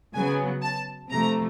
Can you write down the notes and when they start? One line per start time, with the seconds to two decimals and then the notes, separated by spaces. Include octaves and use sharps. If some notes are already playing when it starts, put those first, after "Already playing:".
0.14 C#3 F#3 B3 G#5
0.62 A5
1.10 C3 F3 A3 A#5